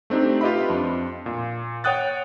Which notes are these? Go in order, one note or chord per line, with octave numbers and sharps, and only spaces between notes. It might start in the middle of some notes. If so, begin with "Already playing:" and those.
A3 C4 D4 D#4 G4
F4 G4 B4 D#5 E5 B5
F2 D4 C6
A#2
C#5 F#5 G5 D#6 F#6 A6